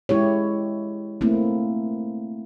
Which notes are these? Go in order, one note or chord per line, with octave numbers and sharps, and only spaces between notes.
G#3 E4 G4 C#5
A3 A#3 C4 E4